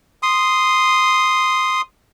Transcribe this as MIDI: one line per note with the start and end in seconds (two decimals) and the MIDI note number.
0.23 1.81 84
0.23 1.81 87